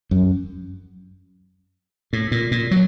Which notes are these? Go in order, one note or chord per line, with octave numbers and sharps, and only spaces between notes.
F#2
A2
A#2
A#2
F#3